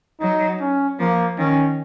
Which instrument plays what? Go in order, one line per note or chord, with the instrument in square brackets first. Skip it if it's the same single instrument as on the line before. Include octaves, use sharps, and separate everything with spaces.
[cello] F#3 [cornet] D#4
[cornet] C#4
[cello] F3 [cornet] A#3
[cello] D#3 [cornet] C#4